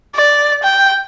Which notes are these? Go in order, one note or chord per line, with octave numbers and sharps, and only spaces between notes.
D5
G5